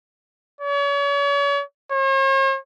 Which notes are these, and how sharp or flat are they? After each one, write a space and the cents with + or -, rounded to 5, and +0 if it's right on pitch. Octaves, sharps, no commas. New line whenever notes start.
C#5 +40
C#5 -45